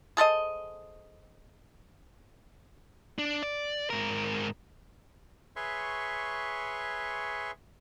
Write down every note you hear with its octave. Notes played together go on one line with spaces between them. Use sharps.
G#4 A4 C5 D#5
D4
D5
G#2 A#4
G#4 B4 C#5 E5 C6 C#6